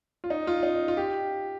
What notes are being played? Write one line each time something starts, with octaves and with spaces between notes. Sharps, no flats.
F4
D#4
F4
D#4
F4
G4